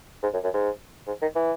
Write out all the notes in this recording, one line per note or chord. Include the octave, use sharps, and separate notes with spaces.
G#2
F#2
F#2
G#2
G#2
D#3
E3